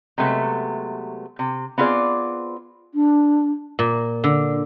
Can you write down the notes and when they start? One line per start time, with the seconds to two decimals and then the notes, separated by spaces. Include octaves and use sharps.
0.18 C3 F#3 G#3 A3 B3
1.39 C3
1.78 B3 C4 F4 G#4 D5
2.95 D4
3.79 A#2
4.24 D3